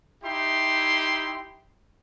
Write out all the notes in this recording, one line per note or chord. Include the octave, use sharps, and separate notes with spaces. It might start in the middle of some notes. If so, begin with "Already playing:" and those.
D#4 E4 G4 C6